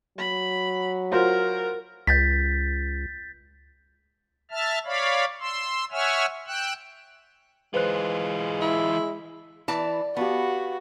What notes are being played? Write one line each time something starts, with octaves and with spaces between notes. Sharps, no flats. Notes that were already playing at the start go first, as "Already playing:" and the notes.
F#3 B5
F4 F#4 A#4 C5
C#2 G6 A6 B6
E5 A5 F6
C#5 D5 F5 B5
C6 E6
C#5 E5 F#5 G#5 E6 F6
G5 E6 F#6
E3 G#3 F4 B4 C5 F#6
E4
E3 D5 A5
B3 F#4 G4 F5 A5